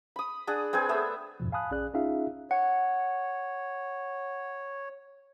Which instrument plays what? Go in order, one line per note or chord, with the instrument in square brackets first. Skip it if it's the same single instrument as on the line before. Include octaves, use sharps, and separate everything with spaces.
[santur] B5 D#6
D4 G#4 F#5
C4 G#4 B4 G#5
A3 B3 E5
[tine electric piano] F2 G#2 B2 F3
F5 G#5 A5 B5 D#6 F#6
A#1 C#4 G#4 D5 F#6
C#4 D#4 F4 G#4 E5 F5
[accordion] C#5 [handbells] F#5